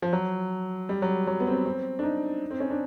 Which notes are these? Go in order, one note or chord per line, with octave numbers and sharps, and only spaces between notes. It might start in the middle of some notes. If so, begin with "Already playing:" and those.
F3
F#3
G3
F#3
F#3
B3
C4
B3
C4
D4
D#4
C4
C#4
D4